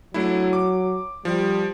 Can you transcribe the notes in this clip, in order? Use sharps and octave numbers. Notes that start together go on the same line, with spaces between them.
F#3 A3 D4 E4
D6
F3 G3